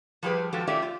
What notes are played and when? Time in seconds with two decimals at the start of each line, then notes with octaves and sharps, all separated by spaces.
0.23 F3 G3 G4 G#4 B4
0.53 F3 G#3 F#4 G4 A4
0.67 A3 C#4 F4 G4 D5 E5
0.82 F4